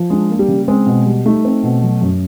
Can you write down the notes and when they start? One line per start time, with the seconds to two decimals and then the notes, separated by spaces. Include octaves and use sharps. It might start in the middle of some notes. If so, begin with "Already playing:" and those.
Already playing: F3
0.10 G#3 D4
0.30 A#3
0.39 G3
0.48 C#3
0.68 G#3 C4
0.86 B2
1.06 G3
1.25 A3 D#4
1.45 C4
1.63 B2
1.82 F#3
2.01 F#2